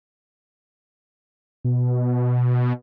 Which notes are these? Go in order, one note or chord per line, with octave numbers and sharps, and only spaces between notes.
B2